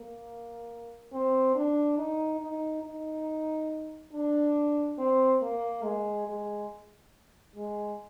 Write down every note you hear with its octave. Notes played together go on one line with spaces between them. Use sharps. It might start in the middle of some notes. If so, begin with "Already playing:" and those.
Already playing: A#3
C4
D4
D#4
D#4
D#4
D4
C4
A#3
G#3
G#3
G#3